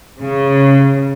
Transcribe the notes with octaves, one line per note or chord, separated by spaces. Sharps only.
C#3